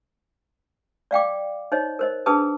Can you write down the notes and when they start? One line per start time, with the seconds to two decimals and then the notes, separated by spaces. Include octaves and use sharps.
1.11 D5 F5 G5 D6
1.72 D#4 C5 C#5 D#5
1.99 A#4 C5 D#5
2.26 D4 G#4 B4 A5 D#6